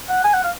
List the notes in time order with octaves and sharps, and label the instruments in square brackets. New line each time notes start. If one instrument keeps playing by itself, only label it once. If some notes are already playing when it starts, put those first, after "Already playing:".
[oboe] F#5
G#5
F#5
F5